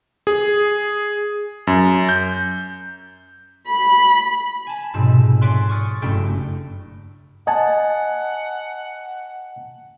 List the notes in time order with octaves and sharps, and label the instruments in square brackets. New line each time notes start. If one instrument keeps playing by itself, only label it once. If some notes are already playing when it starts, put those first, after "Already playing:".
[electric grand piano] G#4
F#2
G6
[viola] B5
[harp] G#5 A5
F1 G#2 B2 C4 E6 E7
C#5 D5 E5 G#5 C6 F#6
C#6 D#6 F6 A6 C#7
F#1 G2 A3 E4 A4 G5
[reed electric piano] D#5 G#5 A5 [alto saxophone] F#5